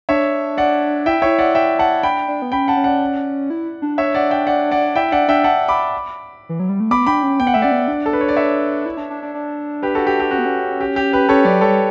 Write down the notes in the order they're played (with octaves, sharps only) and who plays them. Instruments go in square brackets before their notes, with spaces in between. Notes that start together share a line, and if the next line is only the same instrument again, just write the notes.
[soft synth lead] D4 [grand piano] C#5 E5
[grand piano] D5 F#5
[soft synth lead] E4 [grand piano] E5 G5
[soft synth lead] E4 [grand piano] C#5 E5
[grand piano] D5 F#5
E5 G5
F#5 A5
[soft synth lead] D4 [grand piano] G5 B5
[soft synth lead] D4
B3
[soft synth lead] C#4 [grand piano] G5 B5
[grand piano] F#5 A5
[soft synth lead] C#4
[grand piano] D5 F#5
[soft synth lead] E4
D4
[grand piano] C#5 E5
D5 F#5
E5 G5
D5 F#5
D5 F#5
[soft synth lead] E4 [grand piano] E5 G5
[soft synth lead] D4 [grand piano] D5 F#5
[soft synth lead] D4 [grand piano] E5 G5
[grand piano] F#5 A5
B5 D6
[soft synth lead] E3
F#3
G3
A3
[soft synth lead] B3 [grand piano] B5 D6
[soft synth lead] D4 [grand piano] G5 B5
[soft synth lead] C#4
[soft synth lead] B3 [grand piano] G5
[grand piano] F#5
[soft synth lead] A3 [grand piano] E5
[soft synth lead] C#4 [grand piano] D5 F#5
[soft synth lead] B3
D4
[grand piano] A4
B4
C#5
D5
C#5 E5
[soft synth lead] E4
D4
D4
D4
D4
[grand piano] G4 B4
F#4 A4
G4
G4
[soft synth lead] C#4 [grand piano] F#4
[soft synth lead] B3
C#4
[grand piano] G4
G4
G4 B4
[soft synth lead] C#4 [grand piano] A4 C#5
[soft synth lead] F#3 [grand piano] B4 D5
[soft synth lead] G3 [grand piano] A4 C#5